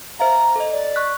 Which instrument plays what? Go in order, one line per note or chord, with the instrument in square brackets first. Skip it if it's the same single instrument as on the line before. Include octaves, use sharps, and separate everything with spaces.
[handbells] C5 E5 F5 [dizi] A#5
[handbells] A4 D#5
[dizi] D5
[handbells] C#6 F#6 B6